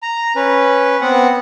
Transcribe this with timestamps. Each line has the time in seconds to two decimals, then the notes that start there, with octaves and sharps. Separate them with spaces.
0.03 A#5
0.36 C#4 B4
1.01 B3 C4 F#5